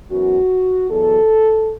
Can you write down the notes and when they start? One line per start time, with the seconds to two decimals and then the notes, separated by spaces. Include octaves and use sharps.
0.10 F#2 E3 B3 F#4
0.90 E2 B2 F#3 A4